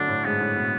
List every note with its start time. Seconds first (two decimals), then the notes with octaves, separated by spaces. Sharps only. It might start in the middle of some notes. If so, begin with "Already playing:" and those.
Already playing: D3 F#3 A3 D4
0.08 A2
0.25 G#2 B3
0.40 A2
0.56 B2